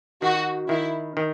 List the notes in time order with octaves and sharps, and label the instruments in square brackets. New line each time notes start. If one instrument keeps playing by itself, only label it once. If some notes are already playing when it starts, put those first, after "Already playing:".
[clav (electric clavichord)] D#3 [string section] F#4
[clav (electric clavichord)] D#3 [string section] E4
[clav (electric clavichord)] D#3